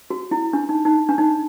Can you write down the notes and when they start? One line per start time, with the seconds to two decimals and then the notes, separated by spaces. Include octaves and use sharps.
0.10 F#4
0.31 E4
0.53 D4
0.69 D#4
0.85 D#4
1.09 D4
1.18 D#4